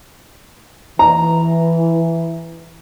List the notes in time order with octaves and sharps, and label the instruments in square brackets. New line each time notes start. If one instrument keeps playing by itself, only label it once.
[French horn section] E3 [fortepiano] A#5